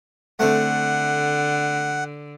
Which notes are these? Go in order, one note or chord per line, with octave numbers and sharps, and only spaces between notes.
D3 A3 C4 F#5